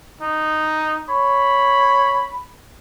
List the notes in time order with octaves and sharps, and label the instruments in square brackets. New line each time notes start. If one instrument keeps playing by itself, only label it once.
[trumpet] D#4
[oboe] C#5 [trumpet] B5